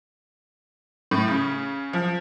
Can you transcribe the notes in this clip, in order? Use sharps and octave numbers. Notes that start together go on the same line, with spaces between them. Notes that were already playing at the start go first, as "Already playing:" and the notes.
A2
C#3
F3